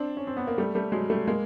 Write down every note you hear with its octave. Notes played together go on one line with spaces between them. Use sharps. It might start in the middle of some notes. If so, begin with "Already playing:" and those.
Already playing: C4 D4
C#4
C4
B3
A#3
G3 A3
G3 A3
F#3 G#3
G3 A3
G#3 A#3